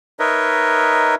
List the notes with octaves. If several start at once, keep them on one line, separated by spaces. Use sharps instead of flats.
D#4 A#4 B4 C#5 D#5 E5